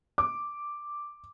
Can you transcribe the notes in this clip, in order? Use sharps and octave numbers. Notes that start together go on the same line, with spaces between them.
D6